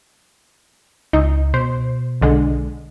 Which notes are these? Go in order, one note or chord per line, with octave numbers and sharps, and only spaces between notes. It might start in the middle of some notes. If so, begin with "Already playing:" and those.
C#2 D#4
B2 C5
B1 D3 G#3